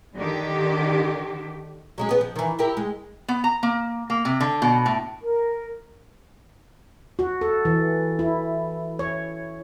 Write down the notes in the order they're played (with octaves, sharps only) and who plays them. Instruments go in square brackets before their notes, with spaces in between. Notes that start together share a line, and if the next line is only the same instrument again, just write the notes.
[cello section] D3 D#3 G4
[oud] F#3 G#3 C#4
B3 G#4
F3
D#3 E3
E4 G4 A#4
G#3
[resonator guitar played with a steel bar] B3
A#5
A#3
A#3
C3
D3
B2
A2
[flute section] A#4
[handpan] F#4
A4
E3
E4
C#5